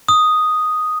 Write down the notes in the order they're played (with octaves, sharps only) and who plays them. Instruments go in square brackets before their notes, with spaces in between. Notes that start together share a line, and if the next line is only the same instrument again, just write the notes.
[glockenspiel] D#6